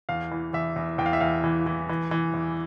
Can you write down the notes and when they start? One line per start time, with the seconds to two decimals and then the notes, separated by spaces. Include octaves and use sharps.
0.09 E2 F5
0.31 E3
0.53 E2 E5
0.76 E2
0.98 E2 G5
1.06 F5
1.13 E5
1.20 E2 F5
1.44 E3
1.66 E3
1.89 E3
2.11 E3
2.34 E2